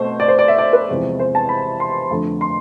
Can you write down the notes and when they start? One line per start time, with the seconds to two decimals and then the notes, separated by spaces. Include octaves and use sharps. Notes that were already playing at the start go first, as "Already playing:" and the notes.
Already playing: B2 A3 C4 C5
0.20 D5
0.28 C5
0.39 D5
0.48 E5
0.58 D5
0.73 B4
0.89 E2 C3 F3 G#3
1.19 C5
1.35 A5
1.49 B5
1.80 C6
2.10 F2 D3 A3
2.41 C6